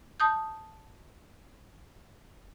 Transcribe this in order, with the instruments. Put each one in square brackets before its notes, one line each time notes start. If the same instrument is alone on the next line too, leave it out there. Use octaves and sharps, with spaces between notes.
[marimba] A5 D#6 G6